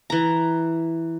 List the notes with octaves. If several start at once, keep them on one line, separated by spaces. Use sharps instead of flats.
E3 A#5